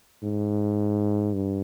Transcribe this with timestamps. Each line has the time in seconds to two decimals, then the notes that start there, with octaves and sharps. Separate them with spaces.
0.23 G#2
1.33 G2